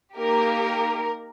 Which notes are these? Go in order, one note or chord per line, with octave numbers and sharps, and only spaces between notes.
A#3 D#4 G4 A#4